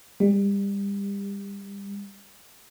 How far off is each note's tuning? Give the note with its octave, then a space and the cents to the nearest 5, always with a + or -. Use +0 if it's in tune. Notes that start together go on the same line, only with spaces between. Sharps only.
G3 +30